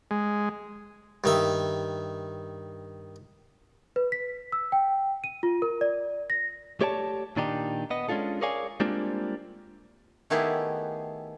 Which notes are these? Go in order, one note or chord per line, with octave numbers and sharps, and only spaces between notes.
G#3
G2 D#3 E5
B4
B6
E6
G5
D#7
F4
A#4
D5
A#6
A3 G4 C#5 D5 G5 A5
A#2 D#3 D4 D#4 G4
B3 D#5
G#3 C#4 D4 F4 A4
G#4 A#4 C#5 D5 F5 G#5
G3 G#3 A#3 C4 D4 F4
D#3 A3 B3 E4 G4 G#4